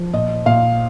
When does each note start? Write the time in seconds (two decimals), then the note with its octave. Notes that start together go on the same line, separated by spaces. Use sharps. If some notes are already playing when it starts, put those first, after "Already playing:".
Already playing: F3
0.13 A#2 D#5
0.46 A#2 F5